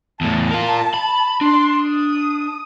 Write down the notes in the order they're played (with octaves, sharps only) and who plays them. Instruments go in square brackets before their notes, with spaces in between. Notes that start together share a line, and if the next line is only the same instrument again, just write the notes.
[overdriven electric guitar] E2 A2 [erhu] A5
[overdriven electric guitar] F4 A#4
B5
[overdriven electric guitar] D4 [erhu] C6
[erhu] D#6